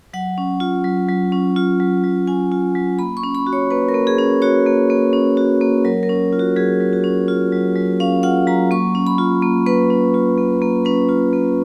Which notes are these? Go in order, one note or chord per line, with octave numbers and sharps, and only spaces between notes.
F#3 F#5
C#4
F4
F#3
F#3
C#4
F4
F#3
F#3
C#4 G#5
F4
F#3
A#3 B5
C#6
C#4
B5
F#4
C#5
A#3 B4
A#4
A#3
G#4
C#4
F#4 C#5
A#3
A#3
C#4
F#4
A#3
F#3 A#4
A#4
C#4
F4
F#4
F#3 G#4
F#3
F#4
C#4
F4
F#3
F#3
C#4 F5
F4 F#5
F#3 A#5
A#3 C#6
C#4
B5
F4
A#3
A#3 B4
C#4
F4
A#3
A#3
C#4 B4
F4
A#3